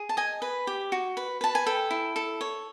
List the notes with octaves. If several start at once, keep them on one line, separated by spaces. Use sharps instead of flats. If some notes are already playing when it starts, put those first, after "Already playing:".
Already playing: G#4
A5
D#5 G#5
B4
G4
F#4
B4
B4 A5
G#5
A4 G5
E4
A4
C#5